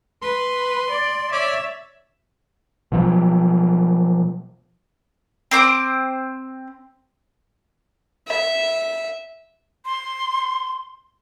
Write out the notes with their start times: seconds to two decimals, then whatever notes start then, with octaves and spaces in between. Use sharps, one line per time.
0.22 B4 C6
0.90 D5
1.32 C#5 D5 E5 D6
2.92 B2 F3 F#3
5.51 C4 C5 D6
8.27 E5
9.85 C6